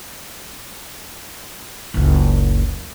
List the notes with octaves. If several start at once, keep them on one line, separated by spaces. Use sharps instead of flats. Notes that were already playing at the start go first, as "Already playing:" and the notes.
F#1 C#2